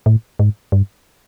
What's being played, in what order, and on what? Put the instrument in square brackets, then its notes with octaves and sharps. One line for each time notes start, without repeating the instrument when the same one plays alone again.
[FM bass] A2
G#2
G2